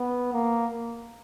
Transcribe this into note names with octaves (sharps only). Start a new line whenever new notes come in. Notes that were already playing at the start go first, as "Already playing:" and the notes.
Already playing: B3
A#3